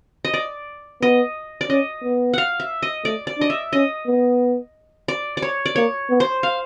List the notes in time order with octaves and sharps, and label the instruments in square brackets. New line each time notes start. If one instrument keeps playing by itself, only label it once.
[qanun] D#5
D5
[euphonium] B3 [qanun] D#5
[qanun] D5
[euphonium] C#4 [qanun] D#5
[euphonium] B3
[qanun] F5 F#5
E5
D#5
[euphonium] A3 [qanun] D5
[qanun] D5
[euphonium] D4 [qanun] D#5
[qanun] E5
[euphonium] C#4 [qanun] D#5
[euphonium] B3
[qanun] D5
D5
C#5
D5
[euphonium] A#3 [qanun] C#5
[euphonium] B3
[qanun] C5
F5